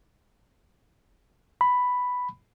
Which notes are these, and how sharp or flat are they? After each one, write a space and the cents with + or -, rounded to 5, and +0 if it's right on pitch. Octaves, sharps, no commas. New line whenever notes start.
B5 +5